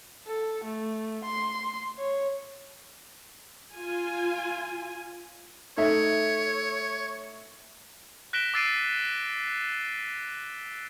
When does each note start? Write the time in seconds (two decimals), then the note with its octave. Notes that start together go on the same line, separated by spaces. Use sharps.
0.27 A4
0.65 A3
1.25 C6
1.99 C#5
3.74 F4 G#5
5.77 A3 D#4 C#5 E5
8.33 F#6 A#6 B6 D7 E7 G7
8.54 D6 E6 A6 C7 D7 D#7